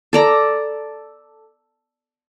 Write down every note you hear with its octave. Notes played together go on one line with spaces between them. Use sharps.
A4 D5 A#5